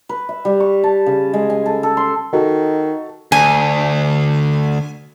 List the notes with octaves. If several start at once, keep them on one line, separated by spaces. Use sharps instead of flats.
B4
E5
G3
C#6
A5
C#3
G#3
G#5
A4
A4
C6
D#3 F#4 A4
D2 G#5